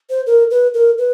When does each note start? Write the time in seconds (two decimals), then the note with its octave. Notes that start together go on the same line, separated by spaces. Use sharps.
0.10 C5
0.26 A#4
0.51 B4
0.74 A#4
0.98 B4